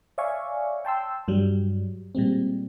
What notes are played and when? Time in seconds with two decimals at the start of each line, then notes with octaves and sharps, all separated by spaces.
0.18 C#5 D5 E5 F5 G#5 C#6
0.85 G5 A5 C6 E6
1.28 G2 F#3 G3
2.15 A#2 G3 G#3 C4